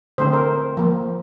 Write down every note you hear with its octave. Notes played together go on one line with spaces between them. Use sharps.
D3 A3 C4 C5
A#4
F3 A#3